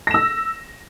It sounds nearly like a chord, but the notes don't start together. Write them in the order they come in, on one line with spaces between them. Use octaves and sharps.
A#6 E7 E6